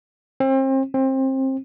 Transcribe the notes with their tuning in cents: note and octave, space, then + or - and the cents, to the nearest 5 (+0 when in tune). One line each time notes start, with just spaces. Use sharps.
C4 +35
C4 +25